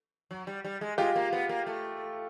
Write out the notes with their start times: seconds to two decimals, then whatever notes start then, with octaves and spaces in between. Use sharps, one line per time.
0.31 F#3
0.47 G3
0.65 G3
0.81 G#3
0.98 G#3 F4 G4
1.16 A#3
1.33 B3
1.49 A#3
1.66 A3